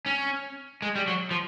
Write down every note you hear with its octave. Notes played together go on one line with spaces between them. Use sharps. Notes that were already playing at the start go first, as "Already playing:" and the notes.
C#4
G#3
G3
F#3
F3